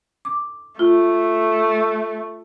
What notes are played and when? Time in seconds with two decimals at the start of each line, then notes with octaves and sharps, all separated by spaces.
0.25 D6
0.79 A3 F4